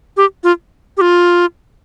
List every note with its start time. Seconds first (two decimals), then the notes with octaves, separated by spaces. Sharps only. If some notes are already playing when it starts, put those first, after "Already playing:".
0.17 G4
0.44 F4
0.97 G4
1.01 F4